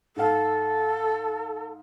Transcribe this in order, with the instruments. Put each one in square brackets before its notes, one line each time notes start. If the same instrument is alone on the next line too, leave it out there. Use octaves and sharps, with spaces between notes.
[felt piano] G#2 F5 [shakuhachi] A4